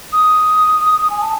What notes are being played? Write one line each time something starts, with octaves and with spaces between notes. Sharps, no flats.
D#6
G#5
A5